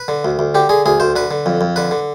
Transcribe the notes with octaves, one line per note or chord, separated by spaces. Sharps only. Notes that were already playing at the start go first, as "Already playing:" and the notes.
Already playing: B4
D3
D2
D2
D3 G4
D3 G#4
D2 G#4
D2 C5
D3 B4
D3
F2
F2
D3 B4
D3